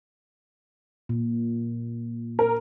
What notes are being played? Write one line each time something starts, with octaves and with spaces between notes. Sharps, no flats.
A#2
A#4